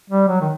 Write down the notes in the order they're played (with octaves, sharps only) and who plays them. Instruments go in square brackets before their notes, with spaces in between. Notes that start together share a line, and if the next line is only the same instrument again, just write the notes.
[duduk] G3
F#3
D#3